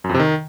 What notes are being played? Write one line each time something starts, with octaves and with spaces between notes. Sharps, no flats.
F#2
F2
C3
D#3